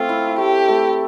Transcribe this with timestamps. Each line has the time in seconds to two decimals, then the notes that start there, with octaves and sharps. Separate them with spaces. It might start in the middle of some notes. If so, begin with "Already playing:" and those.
Already playing: A3 C4 F4
0.09 E4
0.38 A3 G4
0.69 A3